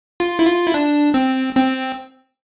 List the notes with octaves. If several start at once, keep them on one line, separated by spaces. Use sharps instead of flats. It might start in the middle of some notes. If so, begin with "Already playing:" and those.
F4
E4
F4
E4
D4
C4
C4